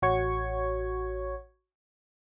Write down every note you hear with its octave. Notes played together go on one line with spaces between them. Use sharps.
A1 F#4 C#5 C#6 G#6